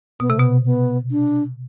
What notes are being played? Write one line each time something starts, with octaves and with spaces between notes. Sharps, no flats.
B2 B3
C3 A3
B2 B3
B3
D4